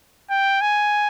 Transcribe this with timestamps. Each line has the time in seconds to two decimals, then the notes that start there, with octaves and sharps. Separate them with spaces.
0.30 G5
0.61 G#5